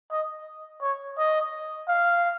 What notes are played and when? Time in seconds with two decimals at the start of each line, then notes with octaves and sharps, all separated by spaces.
0.11 D#5
0.81 C#5
1.18 D#5
1.89 F5